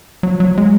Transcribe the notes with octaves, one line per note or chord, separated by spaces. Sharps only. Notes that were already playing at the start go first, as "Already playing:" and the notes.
F#3
F#3
G#3